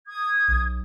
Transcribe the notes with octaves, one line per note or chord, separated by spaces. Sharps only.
D#6 G#6
B1